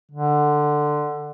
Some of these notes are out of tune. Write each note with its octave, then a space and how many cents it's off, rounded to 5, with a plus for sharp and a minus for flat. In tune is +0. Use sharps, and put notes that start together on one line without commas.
D3 +15